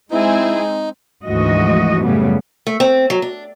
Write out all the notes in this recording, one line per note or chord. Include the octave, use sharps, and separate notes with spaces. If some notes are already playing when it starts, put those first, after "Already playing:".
G#3 C4 D#4 E4 G#4
D2 G#2 E3 F3 F#4 D#5
F#2 A2 C#3 G3 A3 B3
A3
C4
F#3
D4